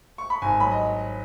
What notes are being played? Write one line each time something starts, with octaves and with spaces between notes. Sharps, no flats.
C#6
B5
G#1 G#5
F#3 B5
D#5